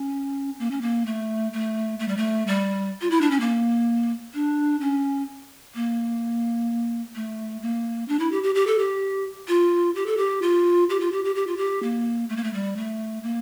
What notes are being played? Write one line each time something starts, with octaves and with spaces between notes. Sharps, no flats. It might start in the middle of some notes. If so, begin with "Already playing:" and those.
Already playing: C#4
A#3
C#4
A#3
A3
A3
A3
G3
A3
G3
F4
E4
D4
C#4
A#3
D4
C#4
A#3
A3
A#3
D4
E4
G4
G4
G4
A4
G4
F4
G4
A4
G4
F4
G4
F4
G4
G4
G4
F4
G4
A#3
A3
A#3
A3
G3
A3
A#3